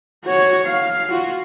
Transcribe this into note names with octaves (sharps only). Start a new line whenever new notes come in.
F#4 C#5
F5
F4 F#4